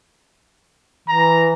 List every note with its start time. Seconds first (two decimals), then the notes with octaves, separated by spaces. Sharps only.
1.08 E3 A#5